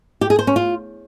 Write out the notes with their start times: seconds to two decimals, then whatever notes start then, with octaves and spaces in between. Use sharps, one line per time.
0.21 G4
0.30 G#4
0.39 C5
0.47 C#4
0.56 F4